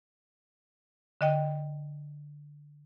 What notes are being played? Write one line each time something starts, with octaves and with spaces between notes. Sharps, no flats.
D3 D#5 G5